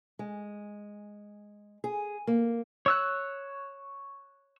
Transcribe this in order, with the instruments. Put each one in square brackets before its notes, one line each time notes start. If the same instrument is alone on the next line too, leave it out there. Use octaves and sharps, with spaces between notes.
[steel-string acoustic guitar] G#3
G#4
A#3
[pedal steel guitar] C#5 E6 F#6